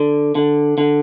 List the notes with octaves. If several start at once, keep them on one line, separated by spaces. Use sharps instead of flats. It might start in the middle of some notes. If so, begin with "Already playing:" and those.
Already playing: D3
D3
D3